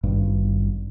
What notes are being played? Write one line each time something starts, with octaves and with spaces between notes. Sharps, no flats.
G#1 G2